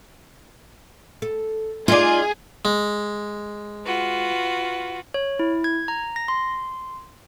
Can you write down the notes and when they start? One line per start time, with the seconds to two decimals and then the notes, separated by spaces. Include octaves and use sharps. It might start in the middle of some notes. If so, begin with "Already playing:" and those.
1.22 A4
1.88 D#4 F4 G#4 D5
2.65 G#3
3.85 F4 F#4 B4
5.14 C#5
5.39 E4
5.64 G#6
5.88 A#5
6.16 A#6
6.28 C6